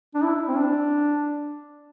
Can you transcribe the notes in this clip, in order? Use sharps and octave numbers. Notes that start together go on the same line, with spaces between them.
D4
E4
C4
D4